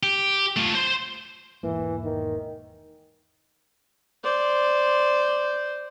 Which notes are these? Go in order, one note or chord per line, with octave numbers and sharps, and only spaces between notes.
G4
A3 F4
C5 C6
E1 G#2 E3 A#3
D#3
C5 D5